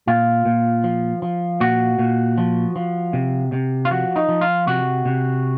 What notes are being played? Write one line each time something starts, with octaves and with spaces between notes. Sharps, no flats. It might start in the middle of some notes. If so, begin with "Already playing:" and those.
A#2 F4
A#2
F3
F3
A#2 F#4
A#2
F3
F3
C3
C3
F4
F3 F#4
D#4
F3
F4
C3 F#4
C3